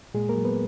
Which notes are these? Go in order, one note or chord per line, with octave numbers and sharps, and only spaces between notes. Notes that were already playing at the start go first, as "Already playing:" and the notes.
A#2 G#3 G#4
A#3 A#4
F#3
B3 B4